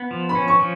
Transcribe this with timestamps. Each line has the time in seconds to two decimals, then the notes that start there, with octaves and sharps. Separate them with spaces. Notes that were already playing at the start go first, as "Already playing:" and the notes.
Already playing: B3
0.11 F3
0.29 B5
0.35 C#4
0.48 C#6
0.60 F3